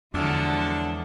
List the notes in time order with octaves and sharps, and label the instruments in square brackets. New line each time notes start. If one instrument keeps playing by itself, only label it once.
[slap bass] E2 [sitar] D3 F#3 [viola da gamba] F3 G#3 A4 [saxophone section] D4